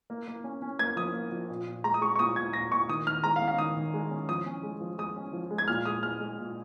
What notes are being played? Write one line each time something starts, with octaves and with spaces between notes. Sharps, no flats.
A#3
A#3
C#4
C#4
A#3 G#6
F3 D#6
A#3
F3
A#2
A#2
G#3 A#5
D#6
G#3 C#6
C#6
A#2 D#6
A#2 G#6
A#2 A#6
A#2 C#6
D#3 D#6
D#3 F6
G#3 A#5
F5
C#4
F5
D#3 D#6
D#3
G#3
C#4
F3 D#6
C#4
G#3
F3
G#3 D#6
C#4
F3
G#3
G#6
A#2 F6
G#3 D#6
G#3 F6
G#3
A#2